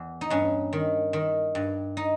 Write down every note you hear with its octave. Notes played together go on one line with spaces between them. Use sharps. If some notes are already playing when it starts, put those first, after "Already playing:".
Already playing: E2
D#4
G2 C#4
D#3
D#3
G2
D#4